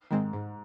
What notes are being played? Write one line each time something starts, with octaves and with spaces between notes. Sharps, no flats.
G#2 D#3 G#3 C4
G#2